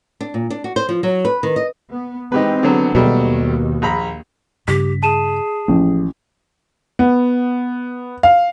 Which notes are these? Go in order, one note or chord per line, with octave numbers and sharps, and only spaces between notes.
D4
A#2
D4
F#4
C5
F3
F#3
B4
D#3
D#5
B3
E3 G#3 C4 D#4 G4 B4
D3 F#3 B3
D#2 B2 F#3 G3 A3
A#1 A#5 B5
G2 C#3 G4 B6
G#4 A5 D#7 E7
A1 F3 A#3
B3
F5